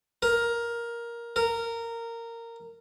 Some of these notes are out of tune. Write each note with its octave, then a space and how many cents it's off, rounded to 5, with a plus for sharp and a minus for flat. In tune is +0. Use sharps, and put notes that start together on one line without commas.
A#4 +10
A#4 -15